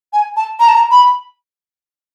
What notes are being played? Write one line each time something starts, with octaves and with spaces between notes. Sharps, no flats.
G#5
A5
A#5
A5
A#5
B5